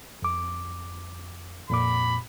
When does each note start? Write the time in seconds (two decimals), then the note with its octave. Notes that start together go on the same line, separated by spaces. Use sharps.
0.22 F2 D6
1.70 F2 A#2 B5 D6